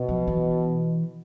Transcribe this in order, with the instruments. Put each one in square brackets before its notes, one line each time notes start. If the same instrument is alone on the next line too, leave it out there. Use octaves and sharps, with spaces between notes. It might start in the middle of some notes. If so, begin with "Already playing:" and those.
Already playing: [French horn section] B2
[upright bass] F3
E3